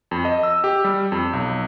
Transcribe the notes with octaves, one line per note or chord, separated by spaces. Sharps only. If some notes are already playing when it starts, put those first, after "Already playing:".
F2
D#5
E6
G4
G3
F2
B1